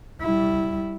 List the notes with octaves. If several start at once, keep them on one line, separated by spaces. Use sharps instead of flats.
G3 E4